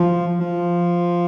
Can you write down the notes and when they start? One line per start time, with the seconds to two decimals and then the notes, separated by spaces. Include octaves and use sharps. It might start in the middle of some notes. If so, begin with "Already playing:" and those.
Already playing: F3
0.40 F3